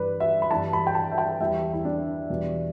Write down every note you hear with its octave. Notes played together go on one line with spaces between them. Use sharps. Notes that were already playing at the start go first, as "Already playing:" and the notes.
Already playing: G2 E3 G3 B4 D5
E5
B5
G2 E3 G3 A5
B5
G5
A5
E5
G5
E2 E3 G3 E5
E4
D4
E2 B2 G3